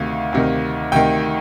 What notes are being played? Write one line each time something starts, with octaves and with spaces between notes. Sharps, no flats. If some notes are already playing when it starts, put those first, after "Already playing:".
Already playing: D2 C3 D#3 F5
D2 C3 D#3
D2 C3 D#3 G5